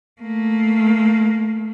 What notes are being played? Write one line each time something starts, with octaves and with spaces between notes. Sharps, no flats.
A3 A#3